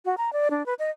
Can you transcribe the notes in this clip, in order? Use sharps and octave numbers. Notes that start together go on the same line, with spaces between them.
F#4
A#5
D5
D4
B4
D#5